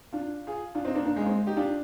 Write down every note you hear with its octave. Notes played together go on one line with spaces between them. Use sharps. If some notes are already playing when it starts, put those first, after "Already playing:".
D4 F4
F4 G#4
D4 F4
C4 D#4
A#3 D4
A#3 D4
G#3
A#3
G#3 C4
D#4 G4
D4 F4